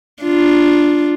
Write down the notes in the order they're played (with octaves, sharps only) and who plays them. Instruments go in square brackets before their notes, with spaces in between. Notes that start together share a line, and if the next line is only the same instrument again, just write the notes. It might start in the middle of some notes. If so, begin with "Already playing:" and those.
[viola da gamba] D4 F4